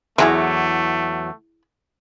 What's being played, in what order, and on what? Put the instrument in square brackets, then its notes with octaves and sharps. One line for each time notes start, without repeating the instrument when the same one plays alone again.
[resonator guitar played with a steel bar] E2 F#3 [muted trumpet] A3 [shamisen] E4 G#4 E5